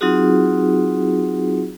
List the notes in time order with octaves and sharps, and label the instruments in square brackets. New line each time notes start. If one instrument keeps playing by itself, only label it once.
[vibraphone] F#3 C4 D#4 F4 F#4 G#4